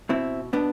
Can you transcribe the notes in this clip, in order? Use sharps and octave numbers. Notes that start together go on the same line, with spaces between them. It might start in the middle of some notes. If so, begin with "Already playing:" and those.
B2 C4 E4
B2 B3 D4